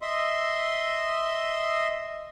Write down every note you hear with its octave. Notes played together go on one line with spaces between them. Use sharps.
D#5 E5 C6